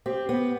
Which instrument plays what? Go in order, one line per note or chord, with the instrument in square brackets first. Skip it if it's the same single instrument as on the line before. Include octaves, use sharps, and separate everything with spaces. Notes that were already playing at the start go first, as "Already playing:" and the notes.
[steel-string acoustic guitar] C4 [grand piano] G4
[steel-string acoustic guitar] B3